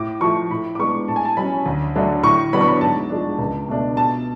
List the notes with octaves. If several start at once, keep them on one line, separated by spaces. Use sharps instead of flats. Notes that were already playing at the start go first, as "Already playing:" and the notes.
Already playing: A2 D6
F3 A3 C#6
A2 B5
D6
G#3 B3 D4 C#6
A2 A5
G#5
A5
F#3 C#4 B5
D2
D3 F#3 A3 D4
A2 C#6
F#3 B3 D4 B5
C#6
B5
G#2 A5
F3 G#3 D4
C#2
B2 A3 D4
B2 A5